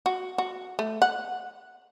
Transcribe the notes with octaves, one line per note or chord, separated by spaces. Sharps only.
F#4
F#4
A3
F#5